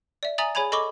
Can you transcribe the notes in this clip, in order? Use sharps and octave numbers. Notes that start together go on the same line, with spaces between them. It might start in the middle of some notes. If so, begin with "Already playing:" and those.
D5 E5
E5 G#5 A#5 D#6 A6 F#7
G#4 C#5 G#5 B5 G#6 F7
A4 D#5 B5 C#6 D6 G7